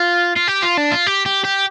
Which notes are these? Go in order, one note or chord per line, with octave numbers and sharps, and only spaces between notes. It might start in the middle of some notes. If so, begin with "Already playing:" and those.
Already playing: F4
F4
G4
F4
D4
F4
G4
G4
G4